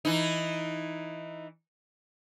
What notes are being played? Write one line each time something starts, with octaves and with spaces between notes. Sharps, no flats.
E3 D#4